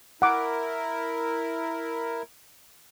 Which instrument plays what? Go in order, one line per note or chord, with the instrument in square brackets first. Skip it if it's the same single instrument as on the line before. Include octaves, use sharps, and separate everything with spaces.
[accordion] E4 A#4 [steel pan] F#5 D6